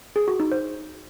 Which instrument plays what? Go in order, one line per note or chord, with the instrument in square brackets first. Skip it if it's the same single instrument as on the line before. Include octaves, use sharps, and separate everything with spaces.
[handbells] G#4
F#4
D#4
C5